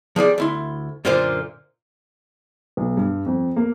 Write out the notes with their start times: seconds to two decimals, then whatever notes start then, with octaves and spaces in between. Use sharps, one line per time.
0.16 F3 G3 G#4 D5
0.38 D2 E4 C6
1.05 F#2 A#2 D3 A#3 F4 C5
2.77 B1
2.97 G2
3.26 F2
3.56 A#3